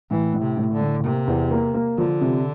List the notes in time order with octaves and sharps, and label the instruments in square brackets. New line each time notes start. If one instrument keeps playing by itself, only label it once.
[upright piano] A2 [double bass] E3
[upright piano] A2
[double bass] C3
[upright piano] A2
[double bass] D3
[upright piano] A2
[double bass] C3 [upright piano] A#3
[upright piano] E2
A#3
A#3
[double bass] D3 [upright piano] F3
[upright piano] C3